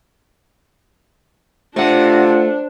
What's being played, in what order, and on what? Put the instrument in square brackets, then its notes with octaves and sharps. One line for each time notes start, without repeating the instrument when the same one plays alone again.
[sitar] C3 [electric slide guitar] A3 F#5 [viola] D4 [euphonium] F4